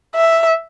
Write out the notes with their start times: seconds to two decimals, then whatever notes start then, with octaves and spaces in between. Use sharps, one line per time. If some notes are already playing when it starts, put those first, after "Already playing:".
0.15 E5